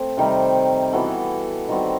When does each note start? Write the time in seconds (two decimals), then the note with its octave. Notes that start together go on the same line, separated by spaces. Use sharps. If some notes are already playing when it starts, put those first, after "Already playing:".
Already playing: A3 C4
0.17 C3 D#3 G3 D#4
0.93 E3 B3 F#4 A4
1.68 D#3 G3 C4 F#4